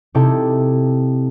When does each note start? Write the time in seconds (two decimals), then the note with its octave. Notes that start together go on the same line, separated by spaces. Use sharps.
0.15 C3 D#4 E4 G4 A4